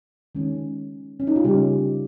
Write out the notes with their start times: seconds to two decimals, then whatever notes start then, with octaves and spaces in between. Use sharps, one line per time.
0.35 D#3 G#3 C#4
1.20 C#4
1.27 D#4
1.36 F4
1.44 C#3 G3 A#3 C#4 G4